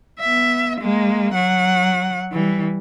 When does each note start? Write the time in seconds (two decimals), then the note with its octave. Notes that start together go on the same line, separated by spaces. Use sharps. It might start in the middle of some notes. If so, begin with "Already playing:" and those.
0.20 B3 E5
0.79 G#3 A#3
1.34 F#3 F#5
2.32 E3 G3